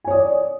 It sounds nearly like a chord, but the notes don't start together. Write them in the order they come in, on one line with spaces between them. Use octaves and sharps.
G#5 C#5 D#6 D5